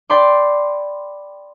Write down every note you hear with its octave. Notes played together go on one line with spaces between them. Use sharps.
D5 G5 B5 C6 D6